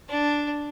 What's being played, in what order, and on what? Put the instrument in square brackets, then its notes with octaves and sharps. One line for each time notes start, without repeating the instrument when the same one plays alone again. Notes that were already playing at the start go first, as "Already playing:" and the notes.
[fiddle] D4